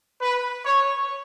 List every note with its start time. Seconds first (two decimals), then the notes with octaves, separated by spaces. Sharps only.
0.22 B4
0.65 C#5